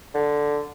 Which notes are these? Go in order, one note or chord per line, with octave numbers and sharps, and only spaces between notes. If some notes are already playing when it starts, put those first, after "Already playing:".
D3